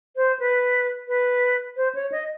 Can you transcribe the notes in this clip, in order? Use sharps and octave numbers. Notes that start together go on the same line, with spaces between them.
C5
B4
B4
C5
C#5
D#5